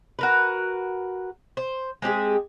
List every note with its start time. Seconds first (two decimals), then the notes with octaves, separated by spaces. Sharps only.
0.19 F#4 A#4 B4
1.57 C5
2.02 G#3 C4 G4 G#4